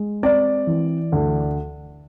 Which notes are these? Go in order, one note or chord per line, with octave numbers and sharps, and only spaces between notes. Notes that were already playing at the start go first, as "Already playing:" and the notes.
Already playing: G#3
C4 D5
E3
D2